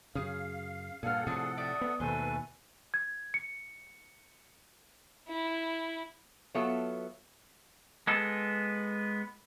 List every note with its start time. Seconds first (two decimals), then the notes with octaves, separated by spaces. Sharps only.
0.15 F#2 C#3 G#4 F5 D#6 F6
1.03 G2 A#2 G#4 A4 F5 F#5 F6
1.27 A2 C3 F3 D4 G#4 D#6
1.57 D5 E5 G5 D#6
1.81 B3
2.00 D#2 B2 A3 A4 B4 C5 G#5
2.94 G#6
3.34 C#7
5.28 E4
6.55 F#3 B3 F4 A4 C#5 E5
8.07 G#3 B3 A4